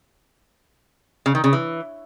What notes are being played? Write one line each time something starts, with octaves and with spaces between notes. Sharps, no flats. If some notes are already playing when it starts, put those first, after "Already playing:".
C#3
D#3
C#3
E3